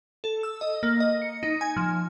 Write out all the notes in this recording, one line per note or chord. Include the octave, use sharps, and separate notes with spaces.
A4
E6
D#5
A#3
D#5
C#7
D#4
G#5
F3